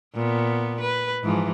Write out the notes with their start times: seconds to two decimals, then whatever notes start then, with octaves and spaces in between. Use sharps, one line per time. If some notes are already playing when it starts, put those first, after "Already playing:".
0.14 A#2 B3
0.81 B4
1.24 G#2 E3 F3